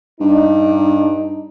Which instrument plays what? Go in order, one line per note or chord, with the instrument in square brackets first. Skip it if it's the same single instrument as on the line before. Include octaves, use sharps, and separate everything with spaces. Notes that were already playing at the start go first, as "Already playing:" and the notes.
[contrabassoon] G2 [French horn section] D4 D#4